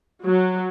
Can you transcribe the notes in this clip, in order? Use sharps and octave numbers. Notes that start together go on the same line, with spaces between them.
F#3